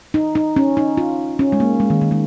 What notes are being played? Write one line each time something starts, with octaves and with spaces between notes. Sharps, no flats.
D#4
D#4
C#4
D#4
F4
C#4
G#3
A#3
G#3
D#3
D#3
G#3